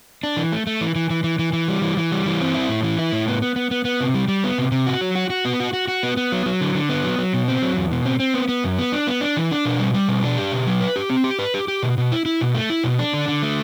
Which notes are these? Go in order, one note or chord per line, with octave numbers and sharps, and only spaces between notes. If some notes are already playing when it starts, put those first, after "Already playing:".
D4
E3
A3
A3
E3
E3
E3
E3
E3
E3
G3
E3
E3
G3
E3
C4
E4
A2
E3
E4
A2
B3
B3
B3
B3
B3
C3
G3
G3
B3
C3
C3
F#4
F#3
F#4
F#4
B3
F#4
F#4
F#4
B3
B3
F#3
F#3
D3
D3
B3
F#3
F#3
B2
C4
F#3
E2
B2
C4
C4
B3
B3
F#2
B3
D4
B3
D4
E3
D4
B2
G3
G3
B2
D4
G4
B2
F#3
B4
G4
C4
G4
B4
G4
G4
B2
B2
E4
E4
B2
A3
E4
B2
D4
D3
D3
A3